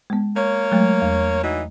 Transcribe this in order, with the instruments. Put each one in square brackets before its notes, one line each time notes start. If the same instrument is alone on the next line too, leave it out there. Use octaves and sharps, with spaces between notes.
[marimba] G#3 B3
[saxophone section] A#3 C#5
[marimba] F#3 G#3 A3
E2
[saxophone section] E3 F#3 D#4